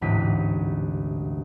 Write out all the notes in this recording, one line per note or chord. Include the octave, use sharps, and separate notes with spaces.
A1 D2 G#2 C3 B6 D#7